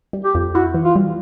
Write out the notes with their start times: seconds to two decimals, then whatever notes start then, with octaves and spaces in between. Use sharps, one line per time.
0.13 G3
0.24 G4
0.35 F2
0.54 E4 F#4
0.74 E3
0.84 F4
0.96 G3